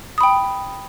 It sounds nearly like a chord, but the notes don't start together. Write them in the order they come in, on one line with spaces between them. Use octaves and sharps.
D#6 B5 G5